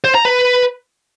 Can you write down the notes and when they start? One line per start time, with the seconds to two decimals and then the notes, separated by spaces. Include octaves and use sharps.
0.04 C5
0.15 A#5
0.25 B4